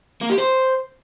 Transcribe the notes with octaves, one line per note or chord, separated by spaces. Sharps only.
A#3
G4
C5